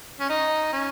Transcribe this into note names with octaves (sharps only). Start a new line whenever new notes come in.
C#4
D#4
C#4